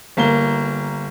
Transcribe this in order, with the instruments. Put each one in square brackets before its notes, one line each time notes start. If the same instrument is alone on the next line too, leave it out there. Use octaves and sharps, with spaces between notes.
[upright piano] G1 A#3 G7